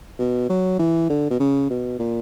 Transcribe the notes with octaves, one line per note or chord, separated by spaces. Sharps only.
B2
F#3
E3
D3
B2
C#3
B2
A#2